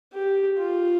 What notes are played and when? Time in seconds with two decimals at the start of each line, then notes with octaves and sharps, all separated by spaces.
0.13 G4
0.58 F4